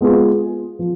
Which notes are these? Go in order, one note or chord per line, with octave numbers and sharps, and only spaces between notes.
G#3 B3 F4 G#4
F3